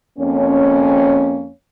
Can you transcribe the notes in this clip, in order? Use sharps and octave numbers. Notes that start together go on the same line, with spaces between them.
F2 A#3 C4 C#4